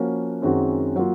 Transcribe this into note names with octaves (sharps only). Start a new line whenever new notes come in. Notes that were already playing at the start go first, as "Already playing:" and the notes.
Already playing: F3 A#3 C#4 F#4 A#4
F#2 D#3 G#3 C4 F#4
F#3 A#3 F4